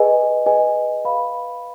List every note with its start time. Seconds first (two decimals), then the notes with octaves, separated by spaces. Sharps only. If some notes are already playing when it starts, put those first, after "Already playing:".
Already playing: G#4 B4 D#5 G#5
0.46 G#4 B4 D#5 G#5
1.05 B4 F5 B5